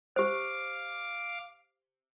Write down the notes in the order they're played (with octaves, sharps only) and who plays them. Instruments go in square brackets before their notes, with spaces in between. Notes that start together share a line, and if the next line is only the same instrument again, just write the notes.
[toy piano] G4 C5 [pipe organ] F5 D6